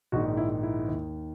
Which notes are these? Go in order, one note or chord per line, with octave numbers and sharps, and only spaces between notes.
A#1 G#2 D#3 F#4
E4
E4
D#2 D#3